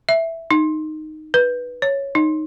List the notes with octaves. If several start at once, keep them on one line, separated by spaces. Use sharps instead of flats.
E5
D#4
B4
C#5
D#4